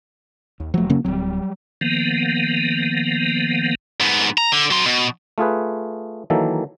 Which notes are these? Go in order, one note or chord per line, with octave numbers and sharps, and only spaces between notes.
D#2
F1 F3 F#3 A3
C#3 A#3 C#4
D1 F#3 G3 C4
D#3 F3 A#3 B3
G#2 B3
A#5
D3
F#3 C6
B2
A3 F4 G#4 B4
D#3 E3 F#3 A#3 A4